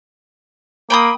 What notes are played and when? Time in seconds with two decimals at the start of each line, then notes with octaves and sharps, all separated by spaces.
0.90 A#3 G5 B5 D#6